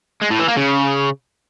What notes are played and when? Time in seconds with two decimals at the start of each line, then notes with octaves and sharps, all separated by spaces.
0.21 G#3
0.30 A2
0.39 E3
0.48 A#3
0.57 C#3